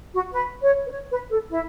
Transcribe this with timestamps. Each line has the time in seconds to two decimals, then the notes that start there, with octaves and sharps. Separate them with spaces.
0.13 F#4
0.32 B4
0.63 C#5
0.86 B4
0.91 C#5
1.11 B4
1.30 A4
1.49 E4